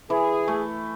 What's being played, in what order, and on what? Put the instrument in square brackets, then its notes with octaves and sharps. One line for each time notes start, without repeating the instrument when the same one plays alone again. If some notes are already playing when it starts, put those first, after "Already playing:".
[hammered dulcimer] E3 [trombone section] G#4
[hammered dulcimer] A3